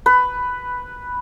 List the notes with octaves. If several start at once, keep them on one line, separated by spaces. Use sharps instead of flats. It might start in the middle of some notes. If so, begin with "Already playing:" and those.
B4